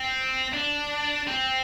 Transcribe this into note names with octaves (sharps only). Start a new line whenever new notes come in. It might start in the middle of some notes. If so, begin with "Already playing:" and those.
Already playing: C4
D4
C4